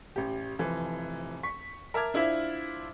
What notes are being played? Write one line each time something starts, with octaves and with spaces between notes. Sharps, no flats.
A1 G4
F1 E3 F3
C#6 B6
A#4 E5 A5 D6 F6 G#6
D4 E4 F4 C5 E5